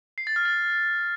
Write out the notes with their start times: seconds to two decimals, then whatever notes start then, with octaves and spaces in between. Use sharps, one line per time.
0.18 C7
0.27 A6
0.36 F6
0.45 A6